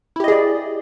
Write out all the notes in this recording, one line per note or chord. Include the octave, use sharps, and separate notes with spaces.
E4 G4 G#4 D5 D#5